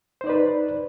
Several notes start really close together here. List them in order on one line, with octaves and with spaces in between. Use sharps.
C5 D#4 D5 B4